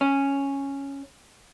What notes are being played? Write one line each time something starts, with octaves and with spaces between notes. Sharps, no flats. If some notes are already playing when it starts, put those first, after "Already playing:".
C#4